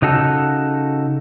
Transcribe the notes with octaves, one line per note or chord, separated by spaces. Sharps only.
C#3 D#4 F#4 A4